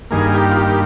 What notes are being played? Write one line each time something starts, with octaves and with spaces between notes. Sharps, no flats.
G2 D#3 A#3 G#4
G4
F4
G4